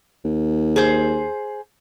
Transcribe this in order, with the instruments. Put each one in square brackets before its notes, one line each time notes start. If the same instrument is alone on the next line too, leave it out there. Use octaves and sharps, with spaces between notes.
[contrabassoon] D#2
[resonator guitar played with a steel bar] G#4 C5